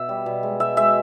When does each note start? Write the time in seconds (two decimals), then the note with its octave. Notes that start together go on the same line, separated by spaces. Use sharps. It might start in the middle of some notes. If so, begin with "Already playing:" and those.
Already playing: B2 E5
0.09 G3
0.26 B2
0.43 G#3
0.60 B2 E5
0.77 G#3 E5